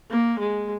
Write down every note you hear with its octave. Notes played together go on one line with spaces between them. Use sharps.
A#3
G#3